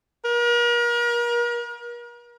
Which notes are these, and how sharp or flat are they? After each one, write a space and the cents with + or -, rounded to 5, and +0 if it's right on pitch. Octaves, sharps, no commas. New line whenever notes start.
A#4 +40